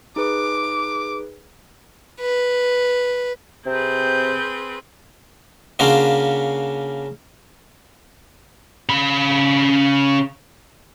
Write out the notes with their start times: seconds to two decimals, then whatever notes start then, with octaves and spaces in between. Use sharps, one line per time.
0.16 D#4 G#4 B4 D6
2.21 B4
3.66 C3 C4 G#4 B4 G6
5.79 C#3 A#3 C#4 D4 F4 F#4
8.89 C#3 B5